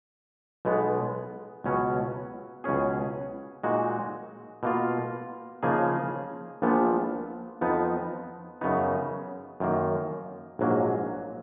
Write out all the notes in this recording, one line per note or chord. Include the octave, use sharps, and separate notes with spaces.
B1 B2 G#3 B3
C#2 B2 F#3 C#4
C#2 B2 F#3 C#4 G#4
A#2 G#3 D#4 F#4
B2 A#3 F4
C#3 F3 A#3 D#4 G#4
A#1 A#2 F3 B3
F2 F3 B3 D#4
F#2 C#3 F#3 B3 D#4
F#2 D#3 A#3
A#1 G#2 F#3 A#3